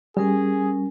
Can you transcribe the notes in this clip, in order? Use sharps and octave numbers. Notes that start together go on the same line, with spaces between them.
G3 C#4 G#4 A#4 G#5